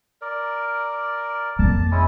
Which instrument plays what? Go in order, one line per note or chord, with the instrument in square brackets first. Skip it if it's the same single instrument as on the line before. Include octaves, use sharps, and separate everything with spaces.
[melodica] A#4 D5
[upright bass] F2 A#3 [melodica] A5
[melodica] G#3 C#4 E4